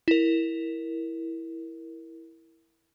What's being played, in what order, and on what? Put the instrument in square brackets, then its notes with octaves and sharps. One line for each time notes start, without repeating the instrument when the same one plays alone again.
[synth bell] E4 A#4